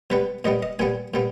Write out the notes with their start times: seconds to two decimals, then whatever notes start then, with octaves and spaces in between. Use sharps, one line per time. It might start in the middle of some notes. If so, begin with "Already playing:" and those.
0.10 B2 G3 B3 B4
0.45 A#2 G3 B3 D#5
0.63 D#5
0.79 A#2 G3 B3 G#5
1.14 A#2 G3 B3